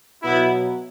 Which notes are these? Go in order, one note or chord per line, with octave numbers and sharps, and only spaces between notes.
B2 F#3 B3 E4